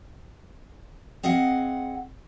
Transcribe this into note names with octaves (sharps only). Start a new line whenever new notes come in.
C4 G#4 D#5 F5 F#5